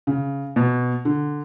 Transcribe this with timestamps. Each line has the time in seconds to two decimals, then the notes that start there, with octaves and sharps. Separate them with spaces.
0.07 C#3
0.56 B2
1.05 D3